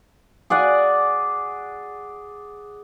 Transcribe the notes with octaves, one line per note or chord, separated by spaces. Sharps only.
G#4 D5 F#5 G#5